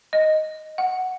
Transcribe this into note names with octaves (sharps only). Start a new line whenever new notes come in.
D#5
F#5